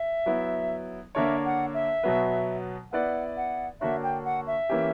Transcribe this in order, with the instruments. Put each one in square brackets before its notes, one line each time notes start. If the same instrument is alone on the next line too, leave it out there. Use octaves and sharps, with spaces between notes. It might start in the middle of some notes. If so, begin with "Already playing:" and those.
Already playing: [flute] E5
[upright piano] F#3 B3 E4
[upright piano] D3 A#3 D4 A#4 C#5 [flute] E5
[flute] F#5
E5
[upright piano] B2 F#3 B3
[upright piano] B3 E4 B4 D5 [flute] F#5
[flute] F#5
[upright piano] D3 A#3 D4 F#4 C#5 [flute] E5
[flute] G5
F#5
E5
[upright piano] E3 A#3 C#4 G4